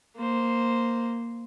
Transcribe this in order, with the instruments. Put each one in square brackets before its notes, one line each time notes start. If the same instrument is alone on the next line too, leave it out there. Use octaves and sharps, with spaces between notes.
[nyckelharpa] A#3 C5